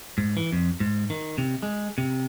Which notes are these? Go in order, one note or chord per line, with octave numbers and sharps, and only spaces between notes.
G#2
E3
F2
G#2
D#3
C3
G#3
C3